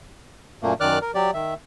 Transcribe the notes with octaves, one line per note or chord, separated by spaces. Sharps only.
F#2 A#2 A3 A#3
F#2 D#3 D5 D6 F6 F#6
A#4
F#3 G4 D5
D#3 E5